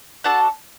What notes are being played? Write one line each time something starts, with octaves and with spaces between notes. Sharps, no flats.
D4 F#4 A4 F#5 A5